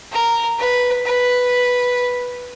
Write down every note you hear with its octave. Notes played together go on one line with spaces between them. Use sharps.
A#4
B4
B4